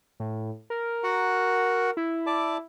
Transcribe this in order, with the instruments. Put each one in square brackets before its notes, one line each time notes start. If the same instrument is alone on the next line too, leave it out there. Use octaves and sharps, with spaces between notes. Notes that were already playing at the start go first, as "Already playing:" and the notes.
[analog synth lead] A2
A#4
[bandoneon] F#4 F#5
[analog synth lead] E4
[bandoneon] D5 A5 D6